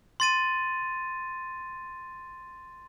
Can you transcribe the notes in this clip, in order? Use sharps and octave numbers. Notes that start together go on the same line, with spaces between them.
C6 A6 D#7